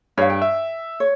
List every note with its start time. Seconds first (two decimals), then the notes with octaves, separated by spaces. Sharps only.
0.18 G2 C#5 F5
0.30 G5
0.42 E5
1.00 C#5